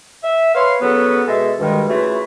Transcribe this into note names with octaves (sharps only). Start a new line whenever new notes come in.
E5
B4 C#5 F5 C6
C#3 F#3 B3 A4 B4
B2 G#3 A4 E5
D2 G2 D#3 G3 G#3
C#3 E3 A3 F4 F#4